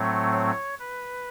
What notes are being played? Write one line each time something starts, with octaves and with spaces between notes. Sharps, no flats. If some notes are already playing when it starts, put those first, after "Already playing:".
Already playing: A2 F#3 A3 C4 C#5
C#5
B4